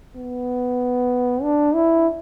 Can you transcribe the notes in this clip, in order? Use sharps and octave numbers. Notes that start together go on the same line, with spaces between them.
B3
D4
E4